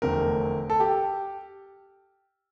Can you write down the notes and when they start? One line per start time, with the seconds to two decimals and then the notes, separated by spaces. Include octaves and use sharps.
0.02 F1 E2 D3 A3 C4 A#4
0.70 A4
0.80 G4